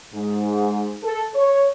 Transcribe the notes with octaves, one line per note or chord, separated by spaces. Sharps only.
G#2
A4
C#5